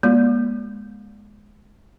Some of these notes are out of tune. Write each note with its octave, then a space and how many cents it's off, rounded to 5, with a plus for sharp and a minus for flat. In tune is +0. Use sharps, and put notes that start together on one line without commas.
G#3 +0 B3 -45